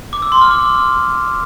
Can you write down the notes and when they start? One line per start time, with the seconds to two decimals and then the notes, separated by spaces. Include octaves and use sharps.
0.13 D6
0.22 E6
0.32 C6
0.41 F6
0.51 D6